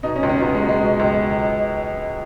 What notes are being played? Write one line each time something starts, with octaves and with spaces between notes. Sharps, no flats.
B2 D#4
C#4
C#2
C#4
C#2 B3
G#3
B2
G#3
B2
C#2